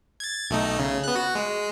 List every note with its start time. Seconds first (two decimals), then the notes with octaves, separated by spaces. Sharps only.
0.20 G#6 A6
0.50 B1 A3 D#4
0.79 C#3
1.04 B3 F#6
1.15 F#4
1.35 G#3